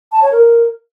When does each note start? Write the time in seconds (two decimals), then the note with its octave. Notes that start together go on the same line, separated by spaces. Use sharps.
0.12 A5
0.22 C#5
0.32 A#4